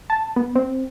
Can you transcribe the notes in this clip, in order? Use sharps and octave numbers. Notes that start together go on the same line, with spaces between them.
A5
B3
C4